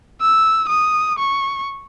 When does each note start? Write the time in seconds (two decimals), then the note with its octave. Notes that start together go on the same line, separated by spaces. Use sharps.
0.21 E6
0.69 D#6
1.19 C#6